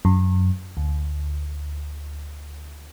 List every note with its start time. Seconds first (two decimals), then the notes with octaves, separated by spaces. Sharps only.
0.05 F#2
0.77 D2